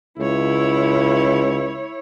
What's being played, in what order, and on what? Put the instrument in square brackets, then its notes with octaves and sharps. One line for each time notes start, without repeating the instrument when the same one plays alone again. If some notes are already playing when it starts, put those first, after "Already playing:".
[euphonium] C#2 [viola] E4 C#5